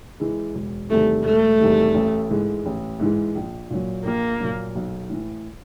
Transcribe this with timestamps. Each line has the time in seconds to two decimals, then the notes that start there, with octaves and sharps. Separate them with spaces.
0.20 E3 G#3
0.54 E1
0.90 E2 C3 D#3 G3 A3
1.24 E1 A3
1.60 E2 C3 D#3 G3
1.94 A1
2.30 G#2 E3 G#3
2.66 A1
3.00 G#2 E3 G#3
3.35 A#1
3.70 A#2 F#3
4.05 A#1 A#3
4.40 A#2 F#3
4.75 B1
5.10 A2 E3